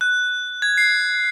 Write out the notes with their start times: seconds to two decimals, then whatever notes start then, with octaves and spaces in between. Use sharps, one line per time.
0.01 F#6
0.62 G#6
0.78 C7